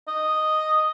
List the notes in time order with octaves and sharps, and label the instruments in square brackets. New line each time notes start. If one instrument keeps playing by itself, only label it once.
[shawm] D#5